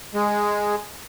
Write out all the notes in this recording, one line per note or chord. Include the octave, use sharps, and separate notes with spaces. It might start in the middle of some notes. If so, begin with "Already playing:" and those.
G#3